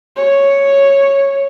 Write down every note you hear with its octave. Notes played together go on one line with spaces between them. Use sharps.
C#5